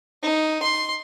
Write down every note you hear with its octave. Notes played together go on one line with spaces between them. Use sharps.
D#4
C6